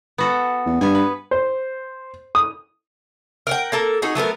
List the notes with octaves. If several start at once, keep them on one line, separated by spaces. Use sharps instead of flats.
B3 F#4 A4
E2
G2 B3 G#5
B4
C5
D#6
A#4 F#5 G5
A#3 A4 A#4
D#4 F#4 G#4
F#3 A3 B3 A#4